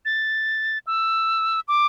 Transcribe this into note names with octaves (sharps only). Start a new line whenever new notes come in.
A6
E6
D6